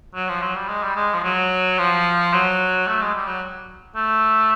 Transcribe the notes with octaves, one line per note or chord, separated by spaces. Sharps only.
F#3
F3
F#3
G3
G#3
G3
G#3
F3
F#3
F3
F#3
A3
G#3
G3
F#3
A3